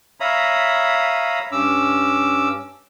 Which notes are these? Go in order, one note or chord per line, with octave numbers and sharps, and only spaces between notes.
C#5 E5 F5 A#5 B5 D#6
G2 C#4 D6 E6